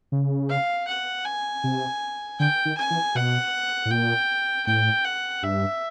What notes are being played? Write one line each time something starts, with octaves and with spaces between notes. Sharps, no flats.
C#3
F5
F#5
G#5
C3
D3 G5
D#3
G#5
E3
B2 F#5
A2
A#2 G5
A2 G5
F#5
G2 E5